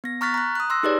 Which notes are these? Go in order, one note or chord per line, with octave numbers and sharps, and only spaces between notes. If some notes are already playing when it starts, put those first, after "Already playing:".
B3 A#6
A#5 C#6 F6 F#6 A6 B6
A#5 F#6
D#6 F#6
C6 E6 A#6
D#4 G4 G#4 B4 C#5 D5